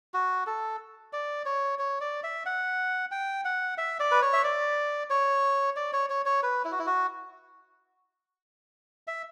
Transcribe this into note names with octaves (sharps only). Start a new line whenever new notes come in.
F#4
A4
D5
C#5
C#5
D5
E5
F#5
G5
F#5
E5
D5
B4
C#5
E5
D5
C#5
D5
C#5
C#5
C#5
B4
E4
F#4
E4
F#4
E5